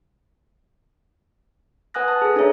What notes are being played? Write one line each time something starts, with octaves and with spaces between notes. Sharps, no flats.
B4 F#5 G#5 D#6 F#6 A#6
A5
G#4 A4
D4 G#4 A4 C#5 E5 A#5